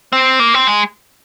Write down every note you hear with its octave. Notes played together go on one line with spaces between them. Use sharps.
C4
A#3
C4
G#3